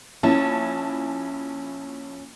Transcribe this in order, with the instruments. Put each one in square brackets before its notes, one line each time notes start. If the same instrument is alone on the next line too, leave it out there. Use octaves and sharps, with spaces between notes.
[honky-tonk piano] A#1 E4 A5 [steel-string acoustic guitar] C#4